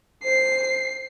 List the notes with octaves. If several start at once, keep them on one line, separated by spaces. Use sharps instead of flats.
C5 C7